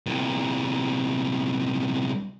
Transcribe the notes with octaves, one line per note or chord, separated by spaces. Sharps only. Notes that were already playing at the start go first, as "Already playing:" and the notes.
C2 A#2